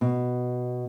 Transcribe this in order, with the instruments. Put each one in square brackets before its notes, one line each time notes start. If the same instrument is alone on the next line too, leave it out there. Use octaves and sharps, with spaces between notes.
[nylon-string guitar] B2